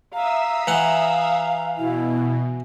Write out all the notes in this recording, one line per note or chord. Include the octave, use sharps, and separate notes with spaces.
E5 F5 A#5 D#6 E6
E3 F#5
B2 E4